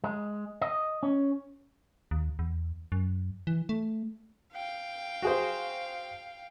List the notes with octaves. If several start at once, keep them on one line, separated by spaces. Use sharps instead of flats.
G#3
D#5
C#4
D#2
E2
F#2
E3
A3
F5 G5
F#4 G#4 C5